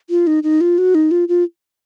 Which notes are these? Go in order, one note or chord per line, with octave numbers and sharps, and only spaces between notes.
F4
D#4
D#4
F4
F#4
D#4
F4
F4